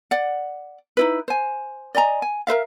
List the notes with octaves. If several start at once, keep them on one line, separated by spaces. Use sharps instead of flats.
D5 F#5
D#4 E4 B4
C5 G#5
D5 D#5 G#5 A#5
G#5
A#4 B4 E5 F5